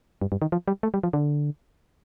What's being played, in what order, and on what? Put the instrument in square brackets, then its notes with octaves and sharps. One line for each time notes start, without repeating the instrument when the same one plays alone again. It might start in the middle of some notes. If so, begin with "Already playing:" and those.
[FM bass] G2
G2
D#3
F3
G3
A3
G3
F3
D3